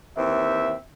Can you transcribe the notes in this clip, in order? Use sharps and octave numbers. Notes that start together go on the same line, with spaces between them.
D#2 E3 C4 E5